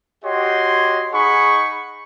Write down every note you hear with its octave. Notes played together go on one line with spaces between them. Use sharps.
F#4 G4 C#5 D#5 C6
D#4 G#4 F#5 B5 C#6